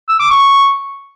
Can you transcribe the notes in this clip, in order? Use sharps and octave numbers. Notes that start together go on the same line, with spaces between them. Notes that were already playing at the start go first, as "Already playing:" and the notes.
E6
D6
C#6